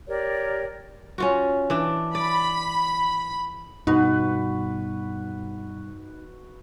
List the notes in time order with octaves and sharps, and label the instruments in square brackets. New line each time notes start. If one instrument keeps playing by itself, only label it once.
[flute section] G4 A#4 C#5 D5
[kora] C#4 F4 F#4
E3 D4
[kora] D5 [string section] B5
[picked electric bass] G2 B2 B3 [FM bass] D#4 [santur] F#4 B4